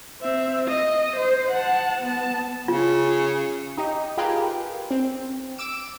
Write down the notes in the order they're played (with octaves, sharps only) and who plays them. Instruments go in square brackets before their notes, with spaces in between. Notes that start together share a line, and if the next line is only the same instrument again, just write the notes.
[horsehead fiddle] C4 E5
D#5
C5
F#5 A5
B3 A5
[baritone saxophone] C#3 [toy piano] F4
[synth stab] D#4 G4 D#5
F4 G4 G#4 A#4 B4
C4
D6 E6 D7 E7